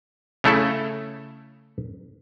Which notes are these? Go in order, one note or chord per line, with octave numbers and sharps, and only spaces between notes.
C#3 A3 E4 A4